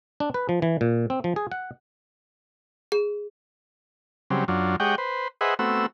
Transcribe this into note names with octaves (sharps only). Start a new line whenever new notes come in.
D4
B4
F3
E3
A#2
C4
F3
G#4
F#5
G#4
C#3 F#3 G3 C4
F#2 F#3 D4 F4
G#3 G4 C#5 D#5 F#5 G5
B4 C5
G#4 B4 C5 D#5 E5 F#5
A3 B3 C4 F#4 E6